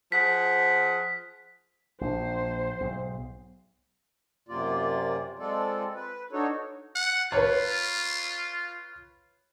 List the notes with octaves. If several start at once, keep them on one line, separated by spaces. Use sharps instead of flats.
F3 G#4 F#5 B6
A#1 C5
B1 G#2
F#2 C3 A#3 F4 D5
G#3 C4 F4 A4 D5
B4
D4 D#4 F#4 A4 C#5
F#5
F4 B4 C#5